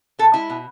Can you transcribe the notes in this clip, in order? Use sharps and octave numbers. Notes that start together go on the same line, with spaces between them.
B2 A4
G#3 E4
B2